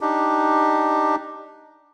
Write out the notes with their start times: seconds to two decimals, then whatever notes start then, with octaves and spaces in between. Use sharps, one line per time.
0.01 D4 D#4 G4